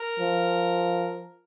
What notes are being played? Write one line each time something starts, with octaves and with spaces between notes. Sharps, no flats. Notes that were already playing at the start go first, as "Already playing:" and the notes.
Already playing: A#4
F3